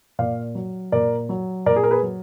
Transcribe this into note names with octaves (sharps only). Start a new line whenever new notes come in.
A#2 D5 F5
F#3
A#2 A#4 D5
F#3
A#2 A#4 D5
G#4
A#4
G#4 B4
F#3